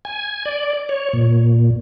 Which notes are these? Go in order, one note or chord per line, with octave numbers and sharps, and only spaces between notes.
G#5
D5
C#5
A#2